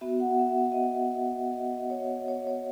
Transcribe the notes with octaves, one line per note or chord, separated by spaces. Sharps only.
B3 F#4 E5
F#5
E5
E5
D#5
E5
D#5
D#5
C#5
C#5
C#5